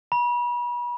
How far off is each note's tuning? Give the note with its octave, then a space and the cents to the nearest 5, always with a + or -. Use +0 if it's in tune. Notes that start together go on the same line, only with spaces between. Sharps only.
B5 -35